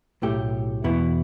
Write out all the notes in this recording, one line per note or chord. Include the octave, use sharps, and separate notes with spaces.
B1 A2 A3 G4
E2 B2 B3 E4